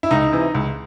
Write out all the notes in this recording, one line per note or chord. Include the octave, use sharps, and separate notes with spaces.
E4
C#2 D#4
C3 E3
C#2